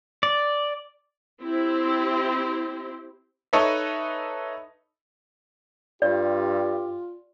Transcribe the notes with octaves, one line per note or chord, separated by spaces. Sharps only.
D5
C4 E4 G4 C5
D#4 A4 B4 C#5 D#5 E5
G2 F4 G4 D5